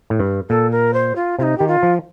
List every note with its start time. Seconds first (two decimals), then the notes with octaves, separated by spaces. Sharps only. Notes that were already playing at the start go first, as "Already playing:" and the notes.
0.10 A2
0.20 G2
0.49 A#2 A4
0.71 A#4
0.94 C5
1.16 F4
1.38 C3 F4
1.43 D#4
1.58 D#3 G4
1.67 F4
1.83 F3